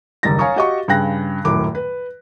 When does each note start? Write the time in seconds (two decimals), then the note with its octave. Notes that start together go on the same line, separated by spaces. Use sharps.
0.23 F#1 D#2 G3 A6 A#6
0.38 C#5 F5 G#5 A#5 C#6 D#6
0.56 F#4 G4 D#5 F5 C#6
0.88 G2 C#3 G#4 G5 F#6 A#6
1.44 D#1 F#2 A2 D6
1.75 B4